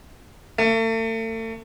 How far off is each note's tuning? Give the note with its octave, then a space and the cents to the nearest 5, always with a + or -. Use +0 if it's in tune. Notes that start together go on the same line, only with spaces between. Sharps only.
A3 +40